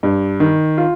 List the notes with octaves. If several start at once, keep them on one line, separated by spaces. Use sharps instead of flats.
G2
D#3
F4